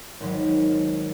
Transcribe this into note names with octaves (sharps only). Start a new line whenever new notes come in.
G#1 F#3